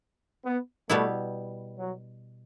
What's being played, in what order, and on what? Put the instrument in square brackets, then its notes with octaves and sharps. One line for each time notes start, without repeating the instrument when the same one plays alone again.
[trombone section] B3
[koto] B2 G3 B3 E4 [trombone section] A3
[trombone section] F#3